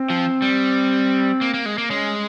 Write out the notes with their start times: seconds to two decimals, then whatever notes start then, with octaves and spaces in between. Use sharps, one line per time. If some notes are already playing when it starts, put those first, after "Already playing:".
Already playing: C4
0.10 F3
0.42 G3
1.41 A#3
1.54 A#3
1.66 G#3
1.78 A#3
1.90 G#3 C#4